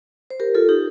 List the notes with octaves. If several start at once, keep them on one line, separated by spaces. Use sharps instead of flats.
C5
G4 A#4
F4 A4
D#4 G4